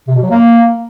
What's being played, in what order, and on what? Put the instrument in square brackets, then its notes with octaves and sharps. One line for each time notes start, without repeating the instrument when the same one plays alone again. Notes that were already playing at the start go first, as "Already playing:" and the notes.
[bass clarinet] C3
B2
F#3
A#3